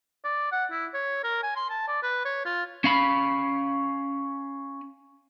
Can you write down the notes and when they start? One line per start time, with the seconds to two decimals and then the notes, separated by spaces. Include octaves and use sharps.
0.24 D5
0.52 F#5
0.71 E4
0.94 C#5
1.24 A#4
1.43 G#5
1.56 C6
1.70 A5
1.88 D5
2.03 B4
2.25 C#5
2.45 F4
2.84 C#4 F5 B5